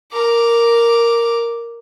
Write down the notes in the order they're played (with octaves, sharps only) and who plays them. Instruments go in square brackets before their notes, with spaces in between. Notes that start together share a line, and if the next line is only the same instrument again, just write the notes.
[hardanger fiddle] A#4 D6